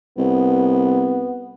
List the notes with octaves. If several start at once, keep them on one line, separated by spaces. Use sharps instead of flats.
C2 B3